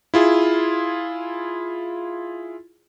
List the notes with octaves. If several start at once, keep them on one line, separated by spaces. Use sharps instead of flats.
E4 F4 G#4